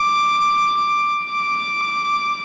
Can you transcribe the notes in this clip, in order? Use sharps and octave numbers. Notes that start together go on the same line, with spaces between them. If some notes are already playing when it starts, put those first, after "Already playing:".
Already playing: D6
D6